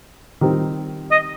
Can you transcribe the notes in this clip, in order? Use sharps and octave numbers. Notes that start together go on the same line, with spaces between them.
D#3 G3 C4
D#5